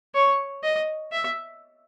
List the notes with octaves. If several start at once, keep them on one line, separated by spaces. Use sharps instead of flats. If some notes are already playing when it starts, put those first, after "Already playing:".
C#5
D#5
E5